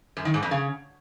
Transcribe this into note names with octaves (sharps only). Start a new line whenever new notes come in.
F#2
D#3
G#2
F2
C#3